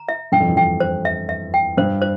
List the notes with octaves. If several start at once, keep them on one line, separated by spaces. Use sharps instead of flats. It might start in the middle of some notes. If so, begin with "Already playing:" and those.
Already playing: A#5
E5
G2 G5
F2
E2
F2 G5
C5
E5
E5
G5
G2 C5
C5